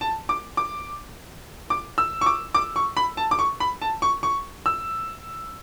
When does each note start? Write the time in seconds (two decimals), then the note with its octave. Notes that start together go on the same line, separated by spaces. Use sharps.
0.01 A5
0.29 D6
0.57 D6
1.70 D6
1.98 E6
2.21 C#6
2.26 D6
2.55 D6
2.76 C#6
2.97 B5
3.17 A5
3.31 D6
3.39 C#6
3.60 B5
3.82 A5
4.02 C#6
4.23 C#6
4.66 E6